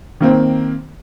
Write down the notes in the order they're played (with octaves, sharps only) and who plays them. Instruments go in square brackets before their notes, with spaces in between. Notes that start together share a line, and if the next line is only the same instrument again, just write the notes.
[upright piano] D#3 A#3 C4